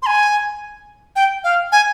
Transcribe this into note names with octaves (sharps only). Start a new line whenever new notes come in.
C6
G#5
G5
F5
G#5